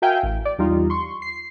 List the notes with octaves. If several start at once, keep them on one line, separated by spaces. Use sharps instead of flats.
F#4 A#4 E5 F5 G5 G#5
A1
D5
E2 G3 D#4 F4
C6 C#6
C7